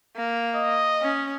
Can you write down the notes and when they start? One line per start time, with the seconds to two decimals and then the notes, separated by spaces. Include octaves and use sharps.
0.16 A#3
0.55 D#5
1.02 C#4